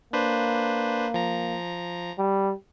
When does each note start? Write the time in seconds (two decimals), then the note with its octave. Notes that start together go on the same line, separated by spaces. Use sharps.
0.13 A#3 D4 B4 C5
1.14 F3 A#5
2.18 G3